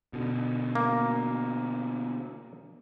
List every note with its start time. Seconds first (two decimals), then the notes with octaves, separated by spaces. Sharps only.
0.13 B2 D3
0.75 A#3